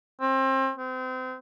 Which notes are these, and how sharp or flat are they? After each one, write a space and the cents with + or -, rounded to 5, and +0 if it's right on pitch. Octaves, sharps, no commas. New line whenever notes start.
C4 +30
C4 -30